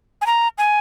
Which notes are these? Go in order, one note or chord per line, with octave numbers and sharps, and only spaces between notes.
G#5
A#5
G#5